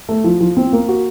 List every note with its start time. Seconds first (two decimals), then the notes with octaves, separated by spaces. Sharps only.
0.09 A3
0.24 F3
0.41 F3
0.57 C4
0.73 A#3
0.88 F#4